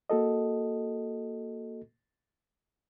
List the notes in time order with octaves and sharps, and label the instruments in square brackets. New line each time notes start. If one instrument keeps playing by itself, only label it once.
[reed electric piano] A#3 F#4 A4 D#5